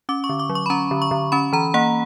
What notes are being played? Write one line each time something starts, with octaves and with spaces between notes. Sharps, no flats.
C#4 D6
C#6
D3
D6
F#3
C#6
B5
C#4 A#5
D3
C#6
D3
C#4 B5
E3 A#5
A#3 F#5